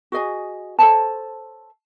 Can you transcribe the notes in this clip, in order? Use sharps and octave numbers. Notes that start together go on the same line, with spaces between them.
F#4 G#4 D#5 G#5
A4 C5 C#5 A5